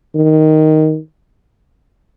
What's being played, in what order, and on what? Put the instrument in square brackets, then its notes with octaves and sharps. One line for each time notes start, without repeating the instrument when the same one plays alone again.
[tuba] D#3